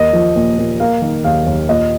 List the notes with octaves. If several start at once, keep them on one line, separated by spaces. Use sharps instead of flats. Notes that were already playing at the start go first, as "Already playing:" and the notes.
Already playing: D#2 A#3 D#5
F3
A#2
A#2
A#3 F5
D#3
D#2 F5
D#2
A#2 D#5